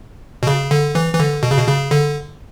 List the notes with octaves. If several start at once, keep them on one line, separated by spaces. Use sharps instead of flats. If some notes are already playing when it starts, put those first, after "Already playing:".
B2
C#3
D3
E3
E3
D3
B2
C#3
B2
C#3
D3